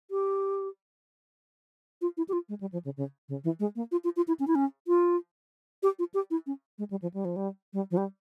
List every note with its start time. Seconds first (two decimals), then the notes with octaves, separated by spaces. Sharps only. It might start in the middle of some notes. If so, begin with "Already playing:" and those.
0.11 G4
2.02 F4
2.17 E4
2.29 G4
2.33 F4
2.49 G#3
2.61 G3
2.73 F3
2.85 C#3
2.97 C#3
3.29 C#3
3.44 E3
3.60 G#3
3.76 A#3
3.92 F4
4.04 F4
4.16 F4
4.28 E4
4.40 C#4
4.48 E4
4.55 C#4
4.88 F4
5.83 G4
5.99 F4
6.14 G4
6.31 E4
6.47 C#4
6.78 G#3
6.90 G3
7.02 F3
7.14 G3
7.25 F3
7.36 G3
7.73 G3
7.91 F3
7.97 G3